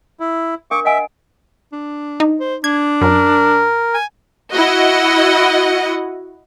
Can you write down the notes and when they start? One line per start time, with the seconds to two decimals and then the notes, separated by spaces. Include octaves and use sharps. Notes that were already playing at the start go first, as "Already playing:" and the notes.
0.20 E4
0.71 D4 A#4 F5 C#6 D6
0.85 D#5 E5 F#5 G#5
1.72 D4
2.20 D#4
2.40 C5
2.64 D4 G#6
3.01 F#2 A#4
3.94 G#5
4.54 E4 F#4 D#5 F#5